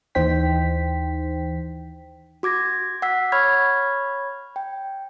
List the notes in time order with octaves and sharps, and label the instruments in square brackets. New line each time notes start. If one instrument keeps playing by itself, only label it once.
[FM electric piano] D#2 E3 D#4 C5 G5 B6
[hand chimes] F#4 D6 G#6 A#6
F#5 E6 B6
C#5 B5 C#6 F6 G#6
G5